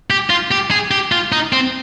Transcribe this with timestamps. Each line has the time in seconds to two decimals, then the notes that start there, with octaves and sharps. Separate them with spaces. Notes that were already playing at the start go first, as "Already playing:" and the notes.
0.10 G4
0.30 F4
0.51 G4
0.71 G#4
0.91 G4
1.12 F4
1.32 D#4
1.53 C4